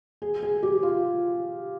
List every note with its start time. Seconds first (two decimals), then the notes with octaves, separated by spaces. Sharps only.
0.22 G#4
0.43 G#4
0.63 G4
0.83 F4